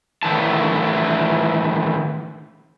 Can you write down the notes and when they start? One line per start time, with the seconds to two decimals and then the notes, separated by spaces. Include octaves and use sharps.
0.23 A2 D#3 E3 A5